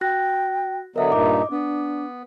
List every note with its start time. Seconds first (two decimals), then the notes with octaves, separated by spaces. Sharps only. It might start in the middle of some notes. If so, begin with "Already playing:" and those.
0.01 F#4 G5 F#6 A#6
0.96 D3 F#3 B3 A#4 D#5 E5
1.12 G2 A#2 D#4 D6
1.50 B3 D4